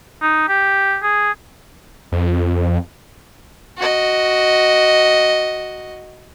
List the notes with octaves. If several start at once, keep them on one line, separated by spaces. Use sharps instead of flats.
D#4
G4
G#4
F2
F#4 D#5